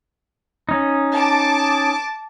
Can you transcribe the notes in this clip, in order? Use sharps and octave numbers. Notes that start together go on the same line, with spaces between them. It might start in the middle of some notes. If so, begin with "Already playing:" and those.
C#4 D#4
A5 D6